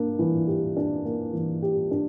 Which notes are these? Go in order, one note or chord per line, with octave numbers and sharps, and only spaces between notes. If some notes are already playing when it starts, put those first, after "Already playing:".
Already playing: A#3 D4
E3
G4
D4
A#3
E3
G4
D4